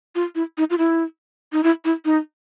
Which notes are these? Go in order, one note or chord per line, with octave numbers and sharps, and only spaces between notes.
F4
E4
D#4
F4
E4
D#4
E4
E4
D#4